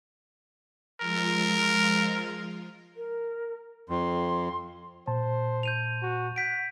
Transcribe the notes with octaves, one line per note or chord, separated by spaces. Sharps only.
F3 G#3 F4 A#4
A#4
F2 C6
A#2 C5 A5
G6 D#7 F7
F#4
F#5 G6 B6 D7